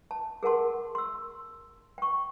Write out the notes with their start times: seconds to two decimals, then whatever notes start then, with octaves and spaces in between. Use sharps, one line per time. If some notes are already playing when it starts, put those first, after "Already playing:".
0.11 A5
0.43 G#4 A#4 F#5 A5 C6
0.95 C6 E6
1.98 G5 C#6